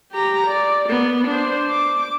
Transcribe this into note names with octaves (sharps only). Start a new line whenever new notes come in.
G4 A#5
D5
A#3 B3
D4 C5
D6